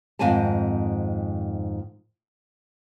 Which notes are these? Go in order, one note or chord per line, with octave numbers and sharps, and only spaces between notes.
F2 G#2 D#3 C4 G#5 A5